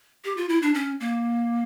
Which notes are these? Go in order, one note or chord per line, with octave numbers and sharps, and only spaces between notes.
G4
F4
E4
D4
C#4
A#3